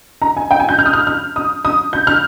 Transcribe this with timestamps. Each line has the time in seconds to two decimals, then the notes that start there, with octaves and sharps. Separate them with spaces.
0.22 A#5
0.37 G#5
0.51 G5
0.60 G#5
0.69 G6
0.79 F6
0.86 D#6
0.93 F6
1.07 F6
1.36 D#6
1.65 D#6
1.93 G6
2.07 F6